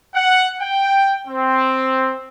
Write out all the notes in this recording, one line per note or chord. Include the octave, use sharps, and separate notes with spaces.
F#5
G5
C4